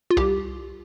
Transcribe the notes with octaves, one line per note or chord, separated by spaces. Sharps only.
F4
C2 G4